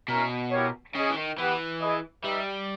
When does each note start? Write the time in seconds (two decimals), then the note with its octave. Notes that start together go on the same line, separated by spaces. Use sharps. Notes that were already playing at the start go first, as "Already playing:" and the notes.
0.08 B2 C#4 E4 A#4
0.51 E4 G4 A#4 C#5
0.94 C#3 C#4 G#4 D#5
1.10 E3
1.16 D#3
1.37 E3 B3 G4 B4
1.80 E4 G#4 B4 D#5
2.24 G3 D#4 G4 B4 E5